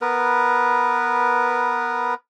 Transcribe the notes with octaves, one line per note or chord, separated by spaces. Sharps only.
B3 A#4 B4